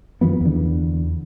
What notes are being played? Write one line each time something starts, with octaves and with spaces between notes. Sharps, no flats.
F#2 D#3 F3 B3
E2 D3